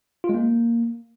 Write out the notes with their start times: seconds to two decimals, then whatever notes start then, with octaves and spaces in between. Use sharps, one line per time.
0.24 F4
0.29 G#3
0.34 A#3